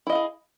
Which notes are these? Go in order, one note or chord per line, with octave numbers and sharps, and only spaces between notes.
E4 G#4 D#5 F5